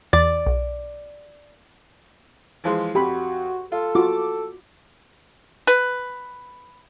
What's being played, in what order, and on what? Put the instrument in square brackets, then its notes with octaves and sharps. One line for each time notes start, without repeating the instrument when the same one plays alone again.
[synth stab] E2 A6 [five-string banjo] D5
[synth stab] B1
[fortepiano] E3 F3 G#3
[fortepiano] F2 [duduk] F#4 [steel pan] G4 B5
[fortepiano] F4 [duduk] A4
[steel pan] F4 F#4 [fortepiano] D6
[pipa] B4